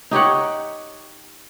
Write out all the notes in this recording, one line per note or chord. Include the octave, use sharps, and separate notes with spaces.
D#4 G4 C#5 F#5